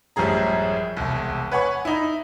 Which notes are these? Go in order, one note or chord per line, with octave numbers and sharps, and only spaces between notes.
A1 F#2 F3 G3 G#4 A#5
E1 C2
B4 C#5 F#5 G#5 C#6
D#4 E4